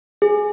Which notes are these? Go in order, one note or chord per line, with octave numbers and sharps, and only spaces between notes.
G#4